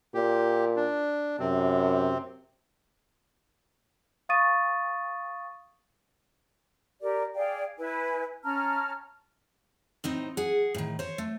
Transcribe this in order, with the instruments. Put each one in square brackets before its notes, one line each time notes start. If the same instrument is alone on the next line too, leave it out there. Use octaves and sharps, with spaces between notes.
[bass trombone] A#2 [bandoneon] G4
[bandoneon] D4
[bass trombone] F#2 [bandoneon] C3 C4
[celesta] F5 C#6 D#6 A6 D#7
[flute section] G4 A#4 D5
G#4 D5 F5 G5
E4 B4 G#5
C#4 A5 A#5 F6
[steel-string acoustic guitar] A2 C4 D#4
G#4 F#5
A2 D#3
C5 C#5
A3